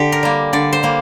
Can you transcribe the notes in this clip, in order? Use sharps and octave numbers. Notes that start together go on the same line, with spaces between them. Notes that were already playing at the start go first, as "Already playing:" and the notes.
Already playing: D3 G4
A#4
G3 A#3
D3 D5
C5
G3 A#3